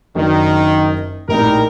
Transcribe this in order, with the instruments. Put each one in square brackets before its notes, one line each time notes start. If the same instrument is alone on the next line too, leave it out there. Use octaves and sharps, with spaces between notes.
[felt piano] F#1 D4 F#4 [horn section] D#3
[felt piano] A#1 A2 C4 [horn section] G3 D#4 A#4